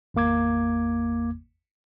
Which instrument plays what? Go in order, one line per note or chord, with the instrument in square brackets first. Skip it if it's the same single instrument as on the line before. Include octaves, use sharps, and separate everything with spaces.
[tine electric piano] G#1 E2 A#3 D6 G#6